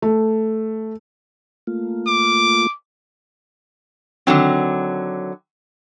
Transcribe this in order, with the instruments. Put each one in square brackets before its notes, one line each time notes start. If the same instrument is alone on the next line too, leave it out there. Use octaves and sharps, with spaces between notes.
[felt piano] A3
[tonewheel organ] A3 A#3 F4
[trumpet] D6
[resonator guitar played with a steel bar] D3 D#3 F#3 C4